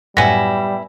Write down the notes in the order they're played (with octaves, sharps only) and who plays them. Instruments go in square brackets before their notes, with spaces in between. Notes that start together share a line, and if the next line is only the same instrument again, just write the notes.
[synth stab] F#2 A2 [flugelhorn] G3 [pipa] B3 E4 [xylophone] G#5 A#6